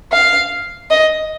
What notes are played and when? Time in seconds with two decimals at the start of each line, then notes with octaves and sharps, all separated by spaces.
0.12 F5
0.90 D#5